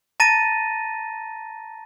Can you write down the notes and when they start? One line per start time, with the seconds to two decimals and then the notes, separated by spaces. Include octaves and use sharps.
0.20 A5 A#5 A6 A#6 D#7